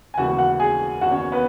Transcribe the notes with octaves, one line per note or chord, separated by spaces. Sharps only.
G#5
E1 D#2 C#3 E3 F#4 F#5
F#4 F#5
G#4 G#5
F#1 E2 D#3 F#4 F#5
C#4 C#5
B3 B4